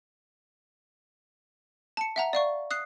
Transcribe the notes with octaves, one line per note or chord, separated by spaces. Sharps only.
A5 C#7
E5 F#5 A#5
D5 F5 C#6
D#6 F#6 C7